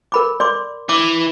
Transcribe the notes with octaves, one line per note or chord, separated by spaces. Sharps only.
A#4 B5 D6
D5 C6 D6
E3 D6